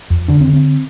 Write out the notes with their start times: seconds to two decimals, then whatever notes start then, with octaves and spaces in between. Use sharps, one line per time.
0.10 F2
0.28 D3 D4
0.41 C4
0.48 D3
0.53 C4